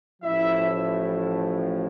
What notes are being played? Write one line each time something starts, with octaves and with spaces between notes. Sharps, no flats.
A1 A2 F3 E4 E5